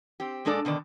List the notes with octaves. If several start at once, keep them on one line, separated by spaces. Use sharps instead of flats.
C4 G4
A#2 G#3 D4 A4 D5
B2 D3 D#3 D5